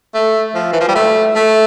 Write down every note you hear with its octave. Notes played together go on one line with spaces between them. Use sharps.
A3
F3
E3
F3
G3
A3
A3